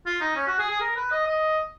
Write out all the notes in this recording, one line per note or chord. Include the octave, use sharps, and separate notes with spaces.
F4
D#4
C#4
F#4
G#4
G#4
A#4
B4
D#5
D#5